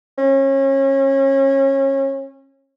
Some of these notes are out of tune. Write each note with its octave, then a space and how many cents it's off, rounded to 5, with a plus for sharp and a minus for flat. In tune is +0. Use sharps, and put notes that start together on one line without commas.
C#4 -30